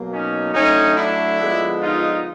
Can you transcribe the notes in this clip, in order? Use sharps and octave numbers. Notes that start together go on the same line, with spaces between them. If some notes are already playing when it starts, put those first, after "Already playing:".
Already playing: B2 F#3 A#3
C#4 D#4
D3 F#3 A3 C#4 D#4
D4 E4
D3 F3 G#3 B3
D#4 F4